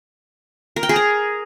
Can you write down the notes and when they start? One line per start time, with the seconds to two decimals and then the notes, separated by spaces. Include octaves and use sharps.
0.76 A#4
0.83 G5
0.89 G#4
0.96 A#5